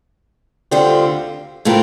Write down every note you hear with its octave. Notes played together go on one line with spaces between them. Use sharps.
D2 D3 G3 C4 F4
A2 A3 C4 F4 A#4